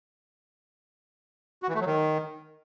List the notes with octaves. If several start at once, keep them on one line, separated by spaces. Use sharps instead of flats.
F#4
E3
A3
F#3
D#3